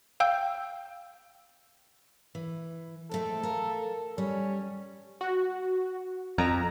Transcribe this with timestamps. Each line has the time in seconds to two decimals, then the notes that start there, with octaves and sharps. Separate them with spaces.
0.20 F5 G5 E6 G6
2.35 E3
3.11 G#3 A3 C4 A4
3.43 A#4 F5
4.18 G3 C#4
5.21 F#4
6.38 F2 A#5